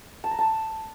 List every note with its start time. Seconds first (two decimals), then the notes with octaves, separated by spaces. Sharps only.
0.24 A5
0.31 A#5
0.39 A5